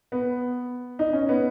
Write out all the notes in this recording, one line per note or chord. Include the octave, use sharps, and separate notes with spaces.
B3
D#4
C#4
B3